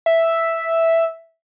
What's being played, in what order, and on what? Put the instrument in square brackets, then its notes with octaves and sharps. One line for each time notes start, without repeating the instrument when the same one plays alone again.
[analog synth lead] E5